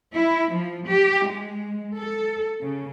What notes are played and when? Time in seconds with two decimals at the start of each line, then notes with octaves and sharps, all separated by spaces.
0.14 E4
0.52 F3
0.88 G4
1.28 G#3
1.96 A4
2.60 C#3